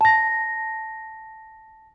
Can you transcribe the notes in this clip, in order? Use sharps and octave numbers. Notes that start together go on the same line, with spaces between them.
A5 A#6